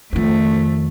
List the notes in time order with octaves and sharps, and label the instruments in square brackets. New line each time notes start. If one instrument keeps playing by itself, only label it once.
[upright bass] F2 D#3 [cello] A3